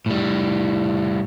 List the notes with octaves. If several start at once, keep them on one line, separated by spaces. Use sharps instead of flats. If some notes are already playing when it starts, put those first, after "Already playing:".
A2 G3